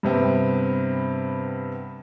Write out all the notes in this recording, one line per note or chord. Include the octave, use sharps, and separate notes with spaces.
G2 C3 B3 C4